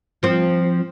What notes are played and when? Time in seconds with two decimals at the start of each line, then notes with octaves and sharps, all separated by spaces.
0.23 F3 C4